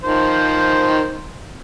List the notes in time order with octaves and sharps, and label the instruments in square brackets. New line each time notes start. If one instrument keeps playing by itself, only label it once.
[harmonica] D#3 F3 C5